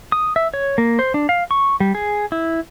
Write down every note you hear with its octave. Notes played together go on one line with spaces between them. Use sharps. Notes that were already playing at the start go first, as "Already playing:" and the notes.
D#6
E5
C#5
A#3
C5
D4
F5
C#6
G3
G#4
E4